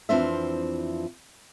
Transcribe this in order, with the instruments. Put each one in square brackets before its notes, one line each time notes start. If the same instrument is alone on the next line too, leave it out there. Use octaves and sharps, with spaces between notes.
[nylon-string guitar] F2 E3 F3 C4 D4 E5